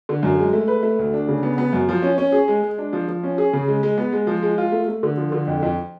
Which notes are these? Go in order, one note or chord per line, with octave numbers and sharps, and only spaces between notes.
D3
F#2
G#3
A3
B4
A3
D2
D4
C#3
B3
B3
F#2
F3
C#4
C#4
G#4
G#3
G#3
D4
F3
F3
C#4
G#4
C#3
G#3
G#3
B3
G#3
F3
G#3
F4
A3
A3
D3
F3
D3
F2
F2